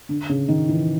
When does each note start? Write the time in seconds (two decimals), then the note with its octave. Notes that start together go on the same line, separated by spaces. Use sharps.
0.09 D3
0.29 C#3
0.48 D#3
0.69 E3